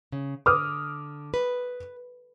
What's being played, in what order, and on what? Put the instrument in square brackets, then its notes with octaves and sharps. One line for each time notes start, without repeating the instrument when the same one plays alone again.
[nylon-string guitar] C#3
[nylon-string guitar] D3 [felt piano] D6 D#6 F6
[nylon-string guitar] B4